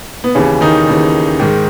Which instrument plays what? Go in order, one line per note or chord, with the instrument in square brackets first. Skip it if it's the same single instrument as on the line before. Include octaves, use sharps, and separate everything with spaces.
[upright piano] B3
D#2 C#3 E3 C#4
D#3 D#4
D#2 C#3 E3
G#2 D#3